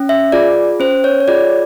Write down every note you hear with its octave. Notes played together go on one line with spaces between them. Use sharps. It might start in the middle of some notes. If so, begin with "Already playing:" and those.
Already playing: C#4
E5
F4 G#4 D5
C#4 C5
C#5
C#5
F4 G#4 D5